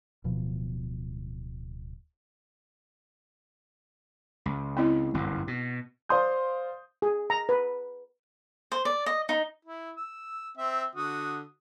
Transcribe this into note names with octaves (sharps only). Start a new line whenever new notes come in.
D1 B2 F3
C#2
C4 E4 D#5
G1 C2 F#2
B2
C5 D5 F5 C6 D#6 G6
G#4
A#5
B4
C5
D5
D#5
D#4
E4
E6
C4 E5
D3 F#4 D#6